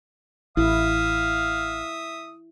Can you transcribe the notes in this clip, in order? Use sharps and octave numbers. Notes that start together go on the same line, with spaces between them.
A1 E4 E5 F5 D#6